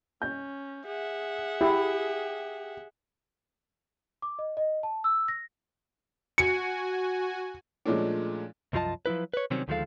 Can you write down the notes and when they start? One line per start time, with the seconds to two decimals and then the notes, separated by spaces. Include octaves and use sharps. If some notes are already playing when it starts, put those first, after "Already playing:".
0.22 C#4 G6
0.86 G#4 E5 F#5
1.61 E4 G4
4.22 D6
4.39 D#5
4.57 D#5
4.83 A5
5.04 E6
5.28 A#6
6.38 F#4 G#5 C#7
7.85 A#2 F3 G#3 A3 C#4 D4
8.73 C2 F#2 F3 F4 D#5 A5
9.06 F3 F#3 E4 B4
9.34 B4 C#5
9.51 C3 D#3 F#3 G3 C4 C#4
9.68 D2 D#3 F3 G#3 A4 F5